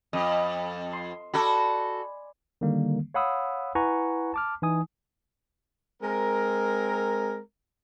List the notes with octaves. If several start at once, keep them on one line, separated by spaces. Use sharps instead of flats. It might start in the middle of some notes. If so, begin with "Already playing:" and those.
F2 D#5
C6
F#4 A4 D5 G#5 B5
D3 D#3 G3 A#3
C#5 F5 F#5 B5 D#6 E6
E4 B4 F#5 G#5 A#5 C#6
A5 D6 F6
E3 D#4 G#5 D#6
G#3 C4 A#4